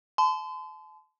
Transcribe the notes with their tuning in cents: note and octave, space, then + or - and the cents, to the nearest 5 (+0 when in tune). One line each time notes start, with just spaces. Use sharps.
A5 -35 C6 -40